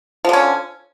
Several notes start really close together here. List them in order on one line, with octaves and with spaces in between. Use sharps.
F3 D3 C#4